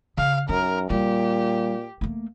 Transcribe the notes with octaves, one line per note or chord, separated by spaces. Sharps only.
C#3 F5
F#2 D#4 A#4
A#2 G3 G4
A3 A#3